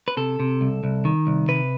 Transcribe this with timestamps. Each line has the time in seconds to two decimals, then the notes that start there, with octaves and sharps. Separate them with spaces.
0.08 B4
0.17 C3 A4
0.40 C3
0.61 C2
0.84 C2
1.05 D#3
1.27 C2
1.48 C3 B4